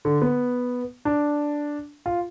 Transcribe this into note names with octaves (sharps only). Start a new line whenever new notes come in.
D3
B3
D4
F4